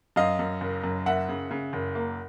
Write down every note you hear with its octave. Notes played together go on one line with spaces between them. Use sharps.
F#2 D#5 F5
F#2
F#1
F#2
F#1 E5 F#5
C#3
C#3
F#1
A#3